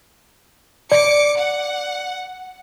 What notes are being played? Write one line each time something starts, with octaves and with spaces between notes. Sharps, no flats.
D5 D6 C#7
F#5